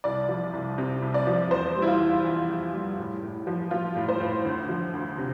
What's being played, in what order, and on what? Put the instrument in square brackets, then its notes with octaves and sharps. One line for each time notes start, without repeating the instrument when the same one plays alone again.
[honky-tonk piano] C2 D5
F3
C2
C3
C2
D5
F3
E2 C5
G3
E4
F4
E2
E3
E2
G3
A2
A2
F3
F3 F4
A2
C5
A2
D2
F3
D2
C3